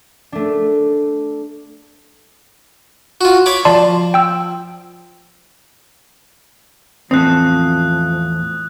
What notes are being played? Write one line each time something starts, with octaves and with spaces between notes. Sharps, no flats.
A3 D4
F4 F#4
C#5 B5 D6
F3 D5 A5 C6
G5 E6
E2 A2 F3 C4 A4 D#6 F#6